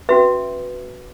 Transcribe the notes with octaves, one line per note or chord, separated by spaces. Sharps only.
C#4 F#4 B4 E5